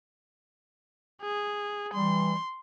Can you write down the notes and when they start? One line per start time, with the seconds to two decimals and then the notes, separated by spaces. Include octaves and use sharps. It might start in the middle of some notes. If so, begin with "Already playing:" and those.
1.22 G#4
1.94 E3 G3 C6